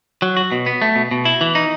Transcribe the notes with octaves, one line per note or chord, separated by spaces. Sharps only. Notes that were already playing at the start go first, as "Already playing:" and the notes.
F#3
F#4
B2
B3
A3
B2
B2
E4
E3
D#4